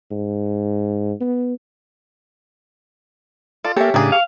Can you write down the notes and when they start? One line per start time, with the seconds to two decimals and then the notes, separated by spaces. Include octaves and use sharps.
0.11 G#2
1.21 B3
3.65 F4 A4 D5 A5
3.76 A#3 C#4 G4 A4 E5
3.94 A2 C#3 A#3 D4 G#4
4.12 F5 C#6